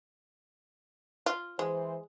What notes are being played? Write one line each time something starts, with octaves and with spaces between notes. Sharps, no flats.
F4
E3 G#3 C5